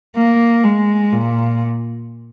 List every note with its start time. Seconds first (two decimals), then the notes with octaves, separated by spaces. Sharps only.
0.16 A#3
0.64 G#3
1.13 A#2